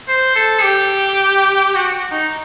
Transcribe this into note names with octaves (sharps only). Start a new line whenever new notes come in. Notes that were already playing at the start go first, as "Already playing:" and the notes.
C5
A4
G4
F#4
D#4